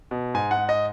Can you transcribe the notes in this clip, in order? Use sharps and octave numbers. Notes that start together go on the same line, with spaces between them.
B2
G#2 G#5
F#5
G#2
D#5